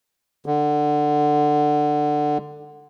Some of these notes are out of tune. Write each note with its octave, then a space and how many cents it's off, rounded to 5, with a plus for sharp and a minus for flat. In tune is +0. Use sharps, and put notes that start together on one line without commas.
D3 +15